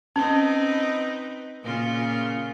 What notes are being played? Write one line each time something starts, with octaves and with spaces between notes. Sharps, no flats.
C4 C#4 D#4 B4
A#2 C#3 F4